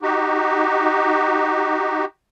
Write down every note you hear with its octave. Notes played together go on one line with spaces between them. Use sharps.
D#4 F#4 G4